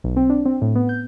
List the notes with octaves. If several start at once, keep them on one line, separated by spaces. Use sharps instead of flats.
B1
C4
D4
C4
A2
B3
G6